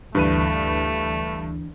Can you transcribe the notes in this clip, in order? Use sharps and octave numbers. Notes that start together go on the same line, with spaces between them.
D2 G2 E3 A3 D4 B4 D#7